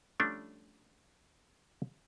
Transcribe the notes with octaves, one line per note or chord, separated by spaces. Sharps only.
F3 G3 A3 C#4 D4